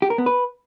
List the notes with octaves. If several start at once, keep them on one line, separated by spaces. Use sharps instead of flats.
G4
A#4
B3
B4